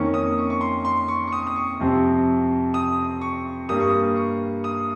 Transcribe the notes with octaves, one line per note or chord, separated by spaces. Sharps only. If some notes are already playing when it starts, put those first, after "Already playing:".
Already playing: F2 D#3 A#3 C#4 C#6
D#6
C#6
C#6
C6
C6
C#6
C#6
D#6
D#6
C#6
F2 C3 F3 C4
D#6
C#6
G2 G3 A#3 D#6
C#6
D#6
C#6
D#6